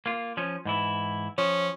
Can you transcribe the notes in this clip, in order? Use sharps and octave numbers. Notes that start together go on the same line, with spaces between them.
A#3 F4
F3 C#4
G#2 E3 E4
F3 C#4